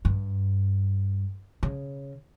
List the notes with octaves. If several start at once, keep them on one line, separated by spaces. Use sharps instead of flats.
G2
C#3